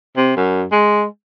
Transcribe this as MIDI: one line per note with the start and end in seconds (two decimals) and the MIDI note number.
0.17 0.35 48
0.36 0.64 42
0.72 1.04 56